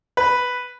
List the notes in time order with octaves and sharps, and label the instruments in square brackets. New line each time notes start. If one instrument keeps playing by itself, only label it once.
[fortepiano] B4